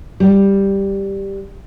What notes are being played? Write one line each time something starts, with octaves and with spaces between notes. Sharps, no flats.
G3